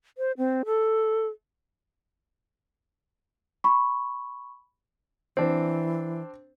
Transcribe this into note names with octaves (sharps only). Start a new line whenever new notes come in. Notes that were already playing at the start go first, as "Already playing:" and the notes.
C5
C4
A4
B5 C#6
E3 C4 D4